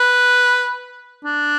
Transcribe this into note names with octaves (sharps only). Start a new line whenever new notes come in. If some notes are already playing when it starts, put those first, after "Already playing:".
Already playing: B4
D4